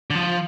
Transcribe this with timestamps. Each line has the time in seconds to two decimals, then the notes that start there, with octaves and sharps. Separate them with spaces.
0.10 D3
0.15 F3